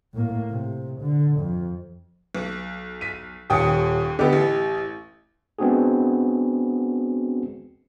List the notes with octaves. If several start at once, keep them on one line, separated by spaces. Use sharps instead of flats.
A2 A#3
C3
D3
F2
B1
B6 D#7
D#1 D#2 G5 D#6 C#7
D3 B3 G4 D#5
A1
G#3 B3 C4 D4 F#4 G#4